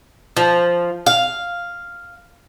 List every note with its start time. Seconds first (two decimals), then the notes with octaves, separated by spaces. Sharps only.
0.37 F3
1.06 F5